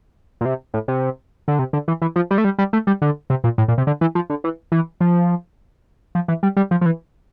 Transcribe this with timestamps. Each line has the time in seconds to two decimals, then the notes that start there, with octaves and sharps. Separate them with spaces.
0.41 A#2
0.45 C3
0.74 A2
0.88 C3
1.48 D3
1.59 C3
1.73 D3
1.88 E3
2.02 E3
2.16 F3
2.31 G3
2.38 A3
2.44 G3
2.58 G3
2.73 A3
2.87 G3
3.02 D3
3.30 C3
3.44 A#2
3.58 A2
3.68 A#2
3.78 C3
3.87 D3
4.01 E3
4.15 F3
4.30 D3
4.44 E3
4.72 E3
5.01 F3
6.15 F3
6.28 E3
6.43 G3
6.57 G3
6.71 F3
6.81 F3
6.86 E3